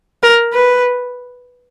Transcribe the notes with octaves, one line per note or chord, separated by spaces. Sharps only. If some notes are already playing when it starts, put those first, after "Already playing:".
A#4
B4